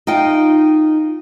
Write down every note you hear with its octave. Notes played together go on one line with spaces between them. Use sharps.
D#4 F4 G5